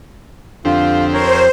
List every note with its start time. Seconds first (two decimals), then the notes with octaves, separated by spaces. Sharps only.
0.65 F2 D3 C4 F4 G4
1.13 A#4 C5 C#5